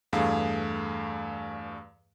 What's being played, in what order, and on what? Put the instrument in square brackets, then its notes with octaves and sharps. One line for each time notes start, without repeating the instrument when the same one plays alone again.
[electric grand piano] E2 G2 A3 G#4 F5